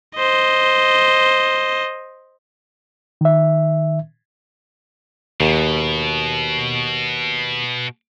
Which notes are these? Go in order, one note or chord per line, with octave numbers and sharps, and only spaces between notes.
C5 D#5
D#3 E5
D#2 B2